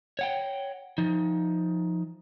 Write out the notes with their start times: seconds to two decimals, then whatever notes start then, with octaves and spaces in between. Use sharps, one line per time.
0.19 C#5 F#5 G5
0.98 F3 D#4